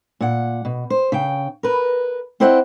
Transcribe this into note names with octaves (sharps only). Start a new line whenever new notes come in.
A#2 F#5
B2
C5
C#3 G5
A#4 B4
C4 E4 C5 D5 D#5 F#5